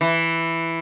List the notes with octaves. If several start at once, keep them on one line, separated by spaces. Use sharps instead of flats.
E3